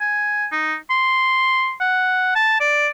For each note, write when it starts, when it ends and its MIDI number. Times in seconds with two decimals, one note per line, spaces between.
0.01 0.47 80
0.52 0.76 63
0.90 1.73 84
1.80 2.33 78
2.35 2.58 81
2.60 2.88 74